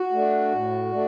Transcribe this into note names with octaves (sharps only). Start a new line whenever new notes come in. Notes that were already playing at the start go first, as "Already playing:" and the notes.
Already playing: F#4
A3 D4
A2
A3 D4